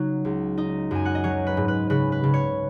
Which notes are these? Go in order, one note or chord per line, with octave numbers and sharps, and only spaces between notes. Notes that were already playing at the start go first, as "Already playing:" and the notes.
Already playing: C#3 F#3 D#4
C#2
D#4 D#5
F#2 G#5
F#5
D#5
F#3 C#5
B4
G#2
B4
C#3 B4
B4
C#3
C#5